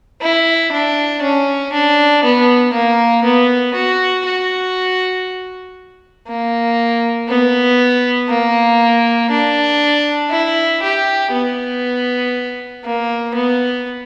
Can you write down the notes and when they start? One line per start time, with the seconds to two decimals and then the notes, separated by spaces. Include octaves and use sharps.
0.22 E4
0.72 D4
1.22 C#4
1.73 D4
2.24 B3
2.73 A#3
3.24 B3
3.74 F#4
4.26 F#4
6.28 A#3
7.29 B3
8.29 A#3
9.30 D4
10.31 E4
10.82 G4
11.32 B3
12.84 A#3
13.34 B3